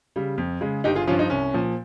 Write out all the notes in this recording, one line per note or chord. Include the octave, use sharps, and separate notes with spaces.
C#3 G3
F2
C#3 G#3
G1 D#4 G4
F4 G#4
G2 F3 C#4 F4
D#4
C2 C#4
A#2 F3